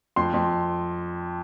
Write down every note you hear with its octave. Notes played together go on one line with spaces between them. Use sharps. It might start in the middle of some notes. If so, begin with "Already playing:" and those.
F2 C6
F2